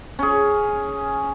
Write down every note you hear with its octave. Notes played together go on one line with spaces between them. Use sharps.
C#4 G#4